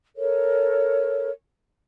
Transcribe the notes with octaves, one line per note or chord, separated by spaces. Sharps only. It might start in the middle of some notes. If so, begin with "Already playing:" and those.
A4 A#4 C#5